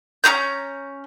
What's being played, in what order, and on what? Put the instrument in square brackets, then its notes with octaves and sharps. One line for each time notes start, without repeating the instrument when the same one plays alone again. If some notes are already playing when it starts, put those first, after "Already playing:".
[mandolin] C#4 G#4 A#5 G6